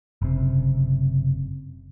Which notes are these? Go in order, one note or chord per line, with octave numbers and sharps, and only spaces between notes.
F#1 C3